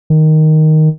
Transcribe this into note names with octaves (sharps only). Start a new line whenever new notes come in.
D#3